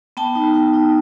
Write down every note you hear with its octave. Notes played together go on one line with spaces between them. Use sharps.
B3 G5 A5
D#4
D#4
D#4